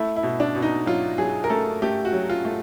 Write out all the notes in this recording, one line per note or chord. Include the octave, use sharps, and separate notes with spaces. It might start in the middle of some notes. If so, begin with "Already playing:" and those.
Already playing: A3 E4
E4
B2
D4
B2
D#4
F#3 F4
F#3 G#4
A#4
A3 A4
A3 G4
F#4
F#3
F4
A3